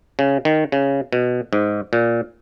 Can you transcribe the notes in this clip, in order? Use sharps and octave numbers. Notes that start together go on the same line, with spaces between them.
C#3
D#3
C#3
B2
G#2
A#2